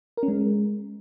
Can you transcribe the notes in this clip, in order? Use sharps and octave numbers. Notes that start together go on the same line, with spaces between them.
A#4
C#4
G#3